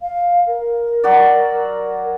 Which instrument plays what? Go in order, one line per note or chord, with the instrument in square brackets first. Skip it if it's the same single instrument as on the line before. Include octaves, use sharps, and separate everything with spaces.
[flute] F5
A#4
[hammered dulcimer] F#3 F#4 D5